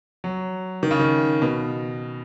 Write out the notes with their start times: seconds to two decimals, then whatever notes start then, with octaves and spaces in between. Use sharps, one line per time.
0.24 F#3
0.83 D#3
0.91 C#3
0.99 D#3
1.42 B2